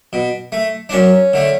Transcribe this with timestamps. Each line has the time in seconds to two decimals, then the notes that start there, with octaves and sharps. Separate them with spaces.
0.13 B2
0.52 A3
0.89 D4
0.92 F#2 C#4
1.33 D3 A3